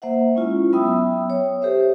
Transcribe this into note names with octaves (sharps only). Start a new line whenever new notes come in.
A#3 C5 E5 F#5
G#3 C#4 E4 F4
F#3 B3 E5 G5 D#6 E6
C#5
G4 A4 C5 E5